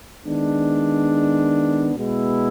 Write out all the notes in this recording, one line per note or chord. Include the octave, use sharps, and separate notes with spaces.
D#3 G#3 B3 D4
B2 G#3 B3 E4